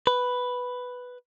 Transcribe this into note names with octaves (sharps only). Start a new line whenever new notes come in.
B4